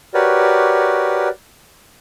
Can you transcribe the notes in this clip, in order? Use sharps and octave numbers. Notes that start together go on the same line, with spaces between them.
F#4 G4 A#4 B4 C#5 D5